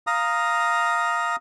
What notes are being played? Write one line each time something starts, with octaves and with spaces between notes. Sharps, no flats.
F5 A#5 D#6